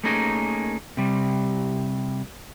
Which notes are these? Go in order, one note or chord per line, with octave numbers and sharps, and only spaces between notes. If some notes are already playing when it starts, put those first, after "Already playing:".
A3 A#3 C#4 D#4 G#4 A#4
C3 G3